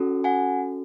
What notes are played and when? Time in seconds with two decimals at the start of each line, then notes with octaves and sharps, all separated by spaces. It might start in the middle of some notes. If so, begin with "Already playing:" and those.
Already playing: C#4 F#4 A4
0.24 F#5 G#5